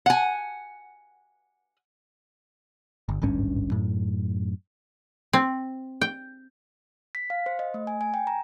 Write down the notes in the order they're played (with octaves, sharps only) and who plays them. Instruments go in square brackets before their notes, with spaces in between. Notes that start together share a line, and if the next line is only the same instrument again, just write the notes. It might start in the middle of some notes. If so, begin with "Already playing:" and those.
[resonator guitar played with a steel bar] F#5 G#5
[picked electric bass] G1
D1 G#1 G2 C#4
F#2 A2
[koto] C4
G5
[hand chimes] B6
F5
C5
D#5
A3
G#5
G#5
G5
A#5